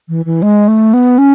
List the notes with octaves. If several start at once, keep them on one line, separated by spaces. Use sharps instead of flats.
E3
E3
G#3
A3
B3
C#4